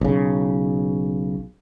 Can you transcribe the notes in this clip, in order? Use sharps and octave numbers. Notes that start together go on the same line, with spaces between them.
B1 C#3